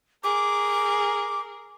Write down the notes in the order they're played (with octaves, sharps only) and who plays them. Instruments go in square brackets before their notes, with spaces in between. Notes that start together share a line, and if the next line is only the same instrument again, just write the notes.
[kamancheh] G#4 A#4 [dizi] D6